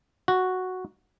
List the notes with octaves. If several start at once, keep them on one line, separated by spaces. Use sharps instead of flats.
F#4